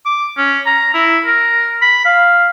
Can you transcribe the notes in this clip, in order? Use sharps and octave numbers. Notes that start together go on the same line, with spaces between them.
D6
C#4
A#5
E4
A#4
B5
F5